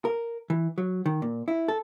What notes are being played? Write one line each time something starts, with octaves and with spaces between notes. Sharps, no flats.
A#4
E3
F#3
D#3
A#2
E4
A4